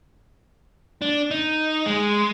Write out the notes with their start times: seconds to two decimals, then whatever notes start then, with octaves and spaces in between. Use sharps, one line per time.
1.02 D4
1.31 D#4
1.86 G#3